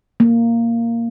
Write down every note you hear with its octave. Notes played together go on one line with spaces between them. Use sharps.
A#3